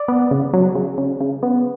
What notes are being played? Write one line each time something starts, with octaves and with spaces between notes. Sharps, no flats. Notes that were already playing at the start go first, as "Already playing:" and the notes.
Already playing: D5
B3
C#3
F#3
C#3
C#3
C#3
B3